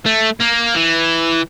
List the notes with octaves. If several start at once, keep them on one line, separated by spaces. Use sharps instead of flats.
A3
A#3
E3